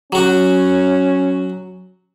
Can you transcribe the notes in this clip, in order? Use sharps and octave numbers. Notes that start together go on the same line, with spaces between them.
F#3 C#4 F#4